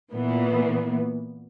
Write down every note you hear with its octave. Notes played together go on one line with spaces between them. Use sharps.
A#2 E3 B3